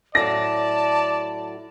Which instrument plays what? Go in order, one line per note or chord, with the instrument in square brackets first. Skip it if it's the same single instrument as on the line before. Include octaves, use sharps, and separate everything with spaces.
[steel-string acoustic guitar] A2 F#3 E4 [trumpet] D5 [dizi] A5 [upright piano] A#6